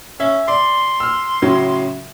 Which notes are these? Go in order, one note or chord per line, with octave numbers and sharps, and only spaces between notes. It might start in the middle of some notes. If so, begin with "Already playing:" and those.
C#4 E5
D5 C6
E6 F6
A2 C#3 F#3